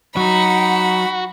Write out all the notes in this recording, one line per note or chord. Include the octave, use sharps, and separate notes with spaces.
F#3 D#4 F#4 B5